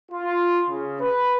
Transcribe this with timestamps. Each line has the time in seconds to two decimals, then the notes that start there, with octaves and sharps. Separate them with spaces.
0.12 F4
0.68 C#3
1.00 B4